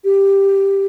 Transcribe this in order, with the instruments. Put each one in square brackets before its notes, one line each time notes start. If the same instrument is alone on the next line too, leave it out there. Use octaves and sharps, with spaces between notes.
[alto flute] G4